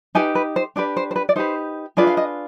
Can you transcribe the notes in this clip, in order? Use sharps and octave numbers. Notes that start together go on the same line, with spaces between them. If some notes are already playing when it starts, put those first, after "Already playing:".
D#4 G4 B4 G#5
B4
C5
D4 G4 B4 D5
C5
C5
B4
D5
D#4 G4 B4 C5
D4 F4 G#4 B4 D5
F5
D#5